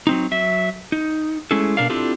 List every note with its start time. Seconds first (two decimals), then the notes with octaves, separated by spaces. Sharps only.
0.07 F#3 C4 D#4
0.31 F#3 E5
0.92 D#4
1.51 G#3 A3 C#4 E4 G#4 A4
1.77 B2 D#3 D4 A#4 D5 F5
1.90 C4 D4 E4 F4 G4 A4